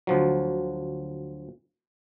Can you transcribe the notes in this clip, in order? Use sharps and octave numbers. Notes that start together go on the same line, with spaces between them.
D2 F3 F#3